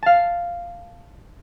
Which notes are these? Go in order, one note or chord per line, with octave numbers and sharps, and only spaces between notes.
F5 A5